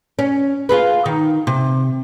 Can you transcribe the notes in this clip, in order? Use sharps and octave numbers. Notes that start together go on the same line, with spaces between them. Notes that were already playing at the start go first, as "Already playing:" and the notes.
C#4
F4 G#4 B4
D#3
C3